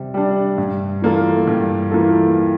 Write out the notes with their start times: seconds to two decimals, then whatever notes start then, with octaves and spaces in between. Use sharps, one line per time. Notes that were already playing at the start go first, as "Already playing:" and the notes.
Already playing: C3 G3
0.14 G3 D4
0.58 G2
1.02 E3 A#3 F4 A4
1.47 G2
1.91 E3 A#3 F4 A4